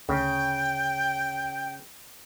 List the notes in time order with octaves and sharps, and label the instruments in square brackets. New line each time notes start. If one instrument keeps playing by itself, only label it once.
[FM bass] D2 [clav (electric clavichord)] C#3 [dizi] G5